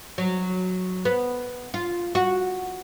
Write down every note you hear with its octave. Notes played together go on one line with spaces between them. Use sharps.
F#3
B3
F4
F#4